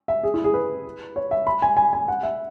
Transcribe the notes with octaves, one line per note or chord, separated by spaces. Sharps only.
E5
G#4
E4
G#4
B4
C#5
E5
B5
G#5
G#5
G#5
F#5
E5